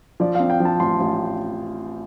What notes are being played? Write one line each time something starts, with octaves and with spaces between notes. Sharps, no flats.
F3 D5
C4 F5
G5
F3
A5
A1 C6
A1